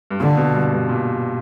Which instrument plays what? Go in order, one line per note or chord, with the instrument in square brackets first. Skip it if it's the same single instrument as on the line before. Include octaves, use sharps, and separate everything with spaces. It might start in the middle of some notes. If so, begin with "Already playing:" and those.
[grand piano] G2
[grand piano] A#2 [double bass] D3
[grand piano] B2
G2
G2
A#2